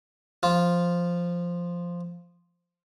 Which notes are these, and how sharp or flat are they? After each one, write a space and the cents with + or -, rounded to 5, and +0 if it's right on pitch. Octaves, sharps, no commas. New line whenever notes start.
F3 +0 F4 +0